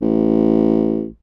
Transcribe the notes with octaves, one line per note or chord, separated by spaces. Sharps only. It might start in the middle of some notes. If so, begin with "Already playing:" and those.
A1